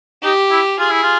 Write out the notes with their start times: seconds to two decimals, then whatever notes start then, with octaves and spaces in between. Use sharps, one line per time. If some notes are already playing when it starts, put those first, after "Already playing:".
0.23 D#4 G4
0.51 E4
0.79 F4 G#4
0.91 E4
1.03 F4